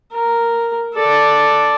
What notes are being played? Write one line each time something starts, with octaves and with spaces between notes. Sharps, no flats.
A#4
A4 D5